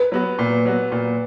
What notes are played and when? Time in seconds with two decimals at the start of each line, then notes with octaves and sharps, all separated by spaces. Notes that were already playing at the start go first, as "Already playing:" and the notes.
Already playing: B4
0.12 F#3 B3 F#4
0.39 A#2
0.65 F#3 B3 F#4
0.92 A#2